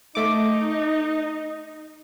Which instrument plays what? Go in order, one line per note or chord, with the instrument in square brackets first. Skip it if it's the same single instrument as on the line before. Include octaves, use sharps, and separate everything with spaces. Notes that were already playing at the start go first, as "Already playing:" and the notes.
[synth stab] A3 D6 [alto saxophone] D#4